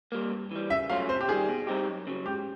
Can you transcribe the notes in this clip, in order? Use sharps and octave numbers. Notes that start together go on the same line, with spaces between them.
G3 A#3
G2
E3 G3
C#3 E5
F#3 A3 C#4 F4 F5
C3 C5
G4
D#3 G3 G#4
B2
G3 C4 D#4 G4
F#2
C#3 F#3
G#2 G4